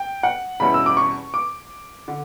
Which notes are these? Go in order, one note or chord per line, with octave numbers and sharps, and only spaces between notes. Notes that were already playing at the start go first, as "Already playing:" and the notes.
Already playing: G5
F#5
E2 B2 G3 C#4 E4 B5
E6
D6
C#6
D6
D3